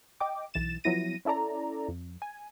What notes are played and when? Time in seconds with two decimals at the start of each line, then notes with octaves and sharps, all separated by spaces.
0.20 D#5 G5 D6
0.54 B1 E3 A6 E7
0.84 F3 F#3 B3 E4 A#6 D#7
1.25 C#4 E4 A4 D5 A#5
1.89 F2
2.22 G#5